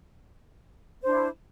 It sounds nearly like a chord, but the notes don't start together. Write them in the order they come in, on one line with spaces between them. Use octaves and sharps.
C5 D4 E4